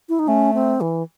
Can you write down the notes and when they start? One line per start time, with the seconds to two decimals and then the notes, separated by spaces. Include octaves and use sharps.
0.09 E4
0.19 D#4
0.28 A3 C#4
0.54 C4
0.81 E3